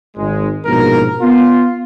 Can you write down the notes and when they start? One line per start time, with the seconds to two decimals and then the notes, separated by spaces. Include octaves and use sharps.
0.16 G#1 G#3
0.66 A#1 G#2 B2 A#4
1.21 B3 F4